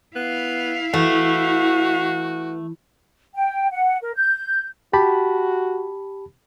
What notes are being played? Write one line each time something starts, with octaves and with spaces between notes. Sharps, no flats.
B3 E4 F5
E3 A3 F#4
G5
F#5
A#4
G6
F#4 G4 A5 B5